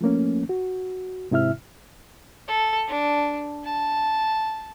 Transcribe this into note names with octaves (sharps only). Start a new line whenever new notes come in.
F3 A3 A#3 C#4
F#4
G#2 C3 E4 E5 F6
A4
D4
A5